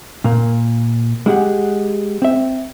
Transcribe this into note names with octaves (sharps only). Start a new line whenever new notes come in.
A#2 A#3
G#3 E4 G4 G#4 F#5
C4 E5